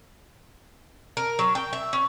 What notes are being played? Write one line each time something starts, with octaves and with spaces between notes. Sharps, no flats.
A#4
F#3
G5
E5
C#4